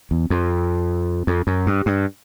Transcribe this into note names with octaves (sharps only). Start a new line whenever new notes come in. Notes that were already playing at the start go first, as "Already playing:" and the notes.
E2
F2
F2
F#2
G2
G2